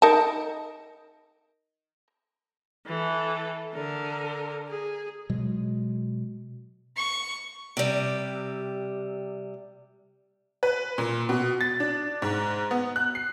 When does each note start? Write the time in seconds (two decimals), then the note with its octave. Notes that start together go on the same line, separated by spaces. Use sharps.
0.02 D#4 A#4 A5
2.86 E3 A4
3.73 D3 A#4
4.68 G#4
5.30 B2 F#3 G#3
6.97 C#6
7.77 C3 G3
10.63 B4
10.98 A#2
11.29 B2
11.61 A6
11.80 D4
12.22 G#2
12.71 B3
12.96 F#6
13.15 C7